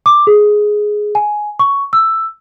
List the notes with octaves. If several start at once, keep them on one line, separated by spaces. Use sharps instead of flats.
D6
G#4
G#5
C#6
E6